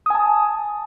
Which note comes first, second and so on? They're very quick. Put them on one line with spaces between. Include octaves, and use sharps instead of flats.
D#6 G#5 A5